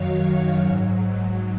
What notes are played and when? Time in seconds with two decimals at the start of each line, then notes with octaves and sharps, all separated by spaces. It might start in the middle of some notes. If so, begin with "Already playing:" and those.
Already playing: F#2 D#3 F#3 C#5 F5
0.57 G#2 F#3